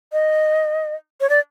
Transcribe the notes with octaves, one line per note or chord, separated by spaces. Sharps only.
D#5
C#5
D5